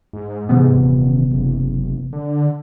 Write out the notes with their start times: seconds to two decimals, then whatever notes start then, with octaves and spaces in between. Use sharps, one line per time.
0.13 G#2
0.49 G#2 C3 E3 B3
0.74 D#1
1.32 F#1
2.13 D3